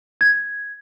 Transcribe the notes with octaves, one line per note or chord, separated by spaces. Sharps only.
G#6